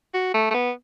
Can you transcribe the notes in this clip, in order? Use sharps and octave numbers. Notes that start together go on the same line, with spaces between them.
F#4
A3
A3
B3